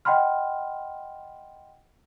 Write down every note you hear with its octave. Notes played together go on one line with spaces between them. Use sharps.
D#5 F#5 G5 B5 C6 F6